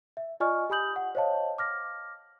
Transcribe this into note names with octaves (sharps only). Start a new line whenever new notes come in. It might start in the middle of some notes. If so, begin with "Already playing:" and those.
E5
F4 D5 D#5 G#5 C#6 F6
G4 G#5 B5 D#6 G6 F#7
F#5
C5 C#5 D#5 F5 A5
D6 F6 A#6